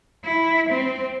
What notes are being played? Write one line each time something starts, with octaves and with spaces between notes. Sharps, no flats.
E4
C4